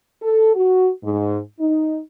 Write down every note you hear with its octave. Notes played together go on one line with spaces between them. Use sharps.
A4
F#4
G#2
D#4